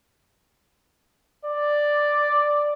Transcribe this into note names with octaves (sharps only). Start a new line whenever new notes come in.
D5